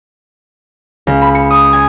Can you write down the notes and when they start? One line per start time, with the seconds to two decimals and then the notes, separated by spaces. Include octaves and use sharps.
1.07 C#2
1.22 B5
1.35 C#7
1.50 D#6
1.73 G#5